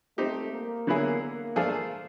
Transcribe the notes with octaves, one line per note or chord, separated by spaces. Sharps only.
A3 C4 D#4 G4
A#3
D3 F#3 B3 E4 G#4
A#3
F3 A3 D4 F4 G#4